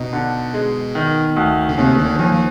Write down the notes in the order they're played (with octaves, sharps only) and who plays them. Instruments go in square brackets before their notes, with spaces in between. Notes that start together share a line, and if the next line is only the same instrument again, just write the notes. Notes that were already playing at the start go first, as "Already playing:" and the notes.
Already playing: [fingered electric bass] B2 [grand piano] D#4
[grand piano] D3
G#3
D#3
D2
[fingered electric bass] D3
[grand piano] D#2 [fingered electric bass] C3
[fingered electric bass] D3
[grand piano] D#2 [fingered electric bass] F3
[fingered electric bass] F3